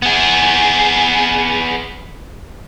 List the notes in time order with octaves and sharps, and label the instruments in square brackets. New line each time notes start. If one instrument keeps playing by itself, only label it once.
[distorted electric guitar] B3 G#4